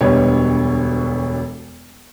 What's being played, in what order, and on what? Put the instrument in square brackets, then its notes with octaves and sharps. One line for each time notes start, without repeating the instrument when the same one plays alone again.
[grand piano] E1 D2 B2 D3 G3 C#5